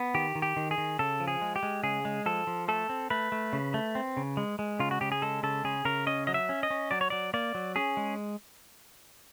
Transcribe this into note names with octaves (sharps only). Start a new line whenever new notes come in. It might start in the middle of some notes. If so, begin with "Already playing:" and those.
Already playing: B3
D#3 G4
D#3
G4
D#3
G#4
D#3
C#3 A4
F3
G#4
G#3
G4
G#3
C#3 G#4
G#3
F3 A4
F3
A3 A4
C4
A3 B4
A3
C#3
A3
C4
C#3
G#3
G#3
C#3 F4
F#4
C#3 G4
G#4
G#3 A4
C#3 A4
C#3 G#4
C#3 A#4
C#4 D#5
F#3 D#5
E5
C#4
D#5
C#4
F#3 D5
C#5
F#3 D5
A#3 D5
F#3
C#4 G#4
G#3